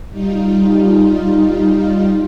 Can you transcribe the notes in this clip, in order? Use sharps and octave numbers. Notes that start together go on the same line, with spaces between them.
G3 D#4 F4